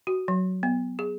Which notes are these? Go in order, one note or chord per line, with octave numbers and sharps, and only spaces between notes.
F#4
F#3
B3
G#4